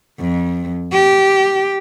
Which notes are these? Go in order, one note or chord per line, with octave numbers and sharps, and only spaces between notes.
F2
G4